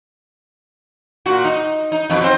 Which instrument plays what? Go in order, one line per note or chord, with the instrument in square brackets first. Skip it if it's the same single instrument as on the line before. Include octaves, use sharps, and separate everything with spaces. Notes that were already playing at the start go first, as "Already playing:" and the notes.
[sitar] A#2 F#4
D#4
D#4
F2 B2
C4 C5